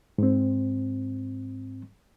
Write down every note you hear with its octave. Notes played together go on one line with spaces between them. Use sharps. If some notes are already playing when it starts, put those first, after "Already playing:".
G#2 C4